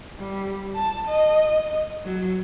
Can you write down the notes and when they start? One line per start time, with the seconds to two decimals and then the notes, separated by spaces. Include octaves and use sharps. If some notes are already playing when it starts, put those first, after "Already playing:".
0.19 G3
0.75 A5
1.07 D#5
2.05 F#3